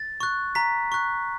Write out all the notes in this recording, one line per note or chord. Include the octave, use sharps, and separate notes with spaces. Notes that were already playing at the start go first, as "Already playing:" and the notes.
Already playing: A6
C#6 F#6
A#5 B6
C#6 F#6